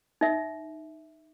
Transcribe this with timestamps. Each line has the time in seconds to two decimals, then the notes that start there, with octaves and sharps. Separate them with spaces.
0.21 D#4 E5